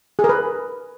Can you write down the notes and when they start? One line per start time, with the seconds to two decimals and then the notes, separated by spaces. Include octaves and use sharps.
0.19 G#4
0.24 A#4
0.29 B4